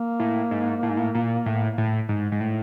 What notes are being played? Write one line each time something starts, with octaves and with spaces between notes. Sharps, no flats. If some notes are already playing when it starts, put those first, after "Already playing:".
Already playing: A#3
A2
G#2
A2
G#2
A2
A#2
A2
A2
G#2
G#2
A2